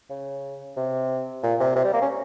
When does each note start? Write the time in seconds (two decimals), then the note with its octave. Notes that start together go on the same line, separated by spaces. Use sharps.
0.10 C#3
0.77 C3
1.43 A#2
1.60 C3
1.76 C3
1.85 G3
1.93 A#3
2.02 C#4